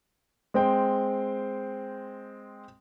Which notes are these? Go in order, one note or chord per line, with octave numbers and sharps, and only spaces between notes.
G#3 C4 G5